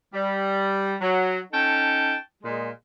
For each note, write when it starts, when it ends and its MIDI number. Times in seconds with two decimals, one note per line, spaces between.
0.13 0.95 55
1.01 1.37 54
1.52 2.15 61
1.52 2.15 63
1.52 2.15 69
1.52 2.15 79
1.52 2.15 81
2.44 2.69 46
2.44 2.69 56